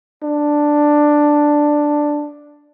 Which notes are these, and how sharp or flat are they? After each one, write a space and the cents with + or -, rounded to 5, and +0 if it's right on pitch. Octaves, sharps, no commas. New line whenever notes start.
D4 +5